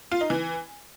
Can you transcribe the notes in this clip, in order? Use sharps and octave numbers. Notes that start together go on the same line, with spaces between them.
F4
D#4
E3